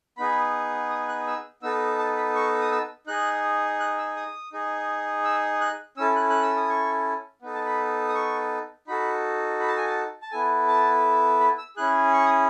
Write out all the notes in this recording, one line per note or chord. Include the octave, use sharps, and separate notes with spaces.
B3 D#4 G#4 B5
D#6
F#6
E6
B3 D#4 A4 E6
A5
B5
C#6
D#6
E6
D#4 G#4 F#6
F#6
E6
D#6
D#4 G#4
E6
F#6
C#4 E4 A4 E6
F#6
F#6
E6
D#6
C#6
B3 D#4 A4
A5
B5
D#6
C#6
D#4 F#4 A4 B5
B5
A5
G#5
A5
A5
B3 E4 A4 G#5
A5
B5
E6
C#4 E4 G#4 F#6
C#6
D#6